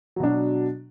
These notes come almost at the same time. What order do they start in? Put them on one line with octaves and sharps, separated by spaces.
F#3 B2 D4